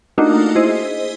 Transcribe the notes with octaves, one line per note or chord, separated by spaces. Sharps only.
A3 A#3 D4 D#4 F4 F#4
E4 G#4 C5 D#5